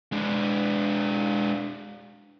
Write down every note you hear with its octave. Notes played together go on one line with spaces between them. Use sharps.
G#3 D4